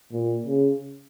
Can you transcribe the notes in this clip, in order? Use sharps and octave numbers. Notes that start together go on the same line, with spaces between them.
A#2
C#3